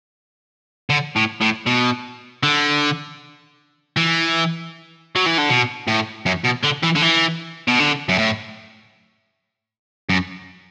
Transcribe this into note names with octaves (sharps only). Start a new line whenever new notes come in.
D3
A2
A2
B2
D3
E3
F#3
E3
D3
B2
A2
F#2
B2
D3
E3
D3
E3
B2
D3
F#2
A2
F#2